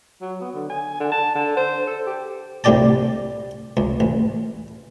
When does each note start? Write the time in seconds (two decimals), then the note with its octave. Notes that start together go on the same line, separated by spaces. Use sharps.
0.21 F#3
0.41 B3
0.55 D3
0.70 G#5
1.00 D3
1.12 A5
1.35 D3
1.57 C5
1.87 A4
2.06 G4
2.64 C2 A2 D3 G4 D5 A5
3.77 C#2
4.00 A1